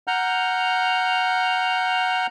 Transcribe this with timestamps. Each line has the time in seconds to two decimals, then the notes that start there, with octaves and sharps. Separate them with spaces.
0.08 F#5 A#5 F6 G6